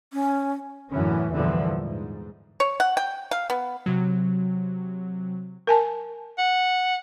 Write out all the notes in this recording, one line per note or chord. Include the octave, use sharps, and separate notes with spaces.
C#4
F#2 A2 D3 E3 C#4
E2 G2 A#2 D3 E3 F3
G#2
C#5
F#5
G5
F5
B3
C3 F#3
A#4 G#5 A5
F#5